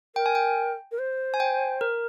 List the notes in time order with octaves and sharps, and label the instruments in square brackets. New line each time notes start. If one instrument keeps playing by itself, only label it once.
[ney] A#4 [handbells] G5
[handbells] G#5
G5
[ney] A#4
C5
[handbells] G#5
G5
A#4